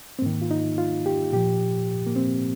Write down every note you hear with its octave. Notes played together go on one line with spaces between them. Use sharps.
C4
G#2 D#3 A#3
F4
D#4
F4
G4
A#2 F3 G4
A#3
C4